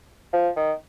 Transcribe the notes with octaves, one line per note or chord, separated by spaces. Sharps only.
F3
D#3